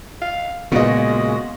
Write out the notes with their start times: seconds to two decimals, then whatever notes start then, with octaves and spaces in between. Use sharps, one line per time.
0.21 F5
0.72 A#2 C#3 G#3 B3 F4 F#4 D#5